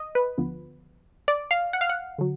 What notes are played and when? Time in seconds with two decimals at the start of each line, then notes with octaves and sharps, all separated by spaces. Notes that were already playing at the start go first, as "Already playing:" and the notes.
Already playing: D#5
0.15 B4
0.38 D2 D3 F3 B3
1.28 D5
1.51 F5
1.73 F#5
1.81 F5
1.89 F#5
2.18 D3 F#3